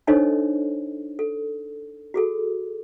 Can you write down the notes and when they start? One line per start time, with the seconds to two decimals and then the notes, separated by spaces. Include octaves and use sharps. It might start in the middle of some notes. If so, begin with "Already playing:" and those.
0.07 D4 D#4 A4 C5 C#5 D#5
1.19 A4
2.14 F#4 G#4 A4